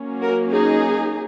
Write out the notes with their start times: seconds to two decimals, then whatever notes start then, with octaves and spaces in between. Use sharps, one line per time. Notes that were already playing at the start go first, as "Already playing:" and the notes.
Already playing: F#3 A#3 C#4
0.21 F#4 A#4
0.53 D#4 G#4